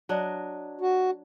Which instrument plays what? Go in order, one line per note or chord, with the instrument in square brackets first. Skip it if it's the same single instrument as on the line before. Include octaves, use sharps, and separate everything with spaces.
[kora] F#3 D4 D#5
[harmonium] F#4